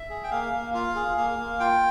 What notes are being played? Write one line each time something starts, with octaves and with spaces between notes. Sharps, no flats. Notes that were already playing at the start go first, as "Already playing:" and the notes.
Already playing: E5
G#4
G5
A#3 F5
A#3
F4 F5
G#4
A#3 F5
A#3
F4 G5